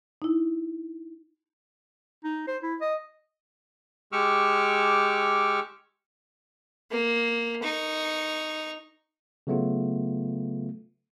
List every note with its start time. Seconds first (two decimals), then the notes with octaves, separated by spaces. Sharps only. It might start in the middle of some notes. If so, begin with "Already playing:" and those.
0.22 D#4 E4
2.24 D#4
2.47 C5
2.63 E4
2.81 D#5
4.12 G#3 G4 C#6 D6 E6 F6
6.91 A#3
7.63 D#4 C#6
9.47 C#3 F#3 A3 B3 F4